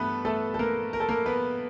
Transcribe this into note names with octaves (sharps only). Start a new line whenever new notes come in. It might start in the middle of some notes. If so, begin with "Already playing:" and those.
Already playing: G2 E3 A3 B3 A4 B4
A3 A4
A4
A#3 A#4
A#4
A4
A#3 A#4
B3 B4